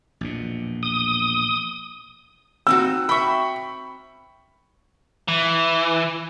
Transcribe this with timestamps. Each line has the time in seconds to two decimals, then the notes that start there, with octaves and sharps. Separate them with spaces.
0.21 A#1 E2 B2
0.83 D#6
2.67 C4 D#4 F#4 E6
3.09 E5 G5 B5 C#6
5.28 E3